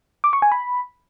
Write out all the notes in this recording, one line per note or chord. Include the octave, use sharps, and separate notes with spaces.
D6
C#6
G#5
B5